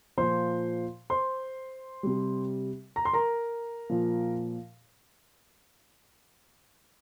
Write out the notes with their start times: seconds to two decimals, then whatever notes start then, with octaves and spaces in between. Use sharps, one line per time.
0.18 A#2 F3 C5 C6
1.10 C5 C6
2.03 C3 G3
2.96 A#5
3.05 C6
3.13 A#4 A#5
3.90 A#2 F3